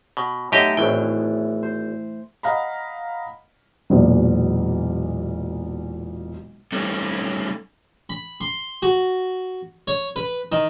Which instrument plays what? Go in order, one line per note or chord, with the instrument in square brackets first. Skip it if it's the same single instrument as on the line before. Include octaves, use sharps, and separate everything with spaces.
[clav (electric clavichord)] B2
[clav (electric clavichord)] F#2 G4 D#5 [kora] A3 B3 D#4
[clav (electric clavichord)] G#1 G5 [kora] A2 E3
[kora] C5
[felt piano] D#5 F5 F#5 A#5 B5
E1 B1 A#2
[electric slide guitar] G3 A3 C#4 D#4 A4
[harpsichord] B5
C6
F#4
C#5
B4
D#3